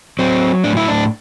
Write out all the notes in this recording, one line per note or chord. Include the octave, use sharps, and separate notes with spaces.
F#3 C4
A2 D4
E4
D4